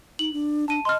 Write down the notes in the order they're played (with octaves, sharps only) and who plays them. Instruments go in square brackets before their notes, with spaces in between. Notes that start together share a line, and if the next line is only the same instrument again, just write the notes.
[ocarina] D#4 [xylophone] F#7
[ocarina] D4
[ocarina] D4 [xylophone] A5 D#7
[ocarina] D#5 [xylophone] C6 F6